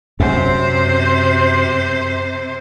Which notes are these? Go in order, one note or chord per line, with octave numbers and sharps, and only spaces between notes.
F#2 C3 C5